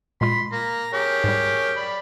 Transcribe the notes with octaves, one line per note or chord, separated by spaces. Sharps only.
A#2 G#3 F4 B5 C6
A#3 A#5
G4 G#4 A#4 C#5
G#2 G3
D5 B5